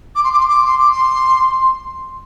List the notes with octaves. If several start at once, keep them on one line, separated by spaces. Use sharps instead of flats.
D6
C6
D6
C6
D6
C6
D6
C6